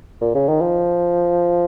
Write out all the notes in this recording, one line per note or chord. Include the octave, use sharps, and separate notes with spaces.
A#2
C#3
D#3
F3